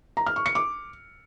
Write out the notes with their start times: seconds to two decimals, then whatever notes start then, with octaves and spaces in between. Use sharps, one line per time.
0.17 A#5
0.26 F6
0.36 C#6
0.46 C#7
0.55 D6